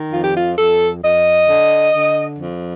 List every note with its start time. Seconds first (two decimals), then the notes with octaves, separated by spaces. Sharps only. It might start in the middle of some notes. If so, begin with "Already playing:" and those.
Already playing: D#3
0.12 F2 F4
0.23 G4
0.33 F4
0.57 F2 A4
1.02 F2 D#5
1.48 D3
1.93 D3
2.39 F2